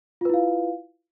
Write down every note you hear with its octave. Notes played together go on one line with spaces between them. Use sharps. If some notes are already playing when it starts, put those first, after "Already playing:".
E4 F4 B4 F5